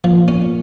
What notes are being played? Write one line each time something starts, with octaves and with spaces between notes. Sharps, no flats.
A#2 F3
C#4